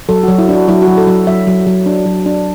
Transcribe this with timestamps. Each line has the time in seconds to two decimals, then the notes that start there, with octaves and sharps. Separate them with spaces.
0.09 F#3 A4
0.23 F#3 F#4
0.38 E4
0.49 D4 F#4
0.68 F#3 E4
0.82 F#4
0.87 F#3
0.97 A4
1.07 F#3
1.27 F#3 E5
1.47 F#3
1.67 F#3
1.86 D4
2.06 F#3
2.26 D4